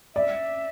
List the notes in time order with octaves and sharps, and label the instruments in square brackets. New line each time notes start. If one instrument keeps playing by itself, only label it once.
[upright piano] D5 [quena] E5